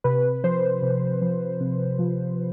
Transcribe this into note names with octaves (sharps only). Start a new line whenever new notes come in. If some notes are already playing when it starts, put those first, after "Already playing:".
C3 B4
F3 C5
C3
F3
C3
F3